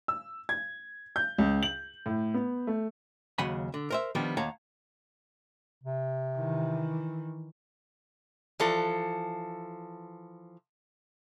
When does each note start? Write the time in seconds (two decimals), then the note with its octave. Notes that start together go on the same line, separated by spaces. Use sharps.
0.08 E6
0.49 G#6
1.16 G6
1.38 C#2
1.63 F#7
2.06 A2
2.34 B3
2.67 A3
3.38 D#2 C#3 F#3 F#5 G#5 B5
3.74 D3
3.90 A#4 C5 E5
4.15 D#3 F3 G3 B3 D4
4.37 D#2 C#5 F5 F#5 A5 A#5
5.84 C3
6.37 D#3 E3
8.60 E3 F3 A4